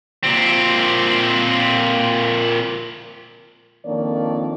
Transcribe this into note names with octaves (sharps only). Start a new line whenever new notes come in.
A#2 C4
F2 D#3 A#3 D4 C#5 D5